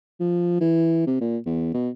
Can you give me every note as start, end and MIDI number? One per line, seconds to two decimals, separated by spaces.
0.20 0.57 53
0.61 1.05 52
1.07 1.18 48
1.21 1.38 46
1.46 1.69 40
1.74 1.90 47